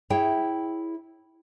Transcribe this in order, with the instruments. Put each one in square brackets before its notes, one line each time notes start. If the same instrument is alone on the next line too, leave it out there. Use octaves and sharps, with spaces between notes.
[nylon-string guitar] E4 G#4 C#5 G5